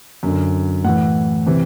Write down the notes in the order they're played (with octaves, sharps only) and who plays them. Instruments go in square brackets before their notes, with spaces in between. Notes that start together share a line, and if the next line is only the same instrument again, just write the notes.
[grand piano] F#2 D3
A2 E3 F#5
C3 E3